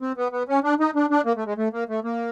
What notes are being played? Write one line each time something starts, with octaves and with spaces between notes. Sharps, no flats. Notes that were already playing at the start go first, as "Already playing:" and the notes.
C4
B3
B3
C#4
D4
D#4
D4
D4
A#3
A3
G#3
A3
A#3
A3
A#3